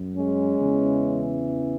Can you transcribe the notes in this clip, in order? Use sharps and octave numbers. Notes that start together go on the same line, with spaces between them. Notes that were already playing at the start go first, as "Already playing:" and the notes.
Already playing: F#2
G#3 C#4
E2 C#3 E3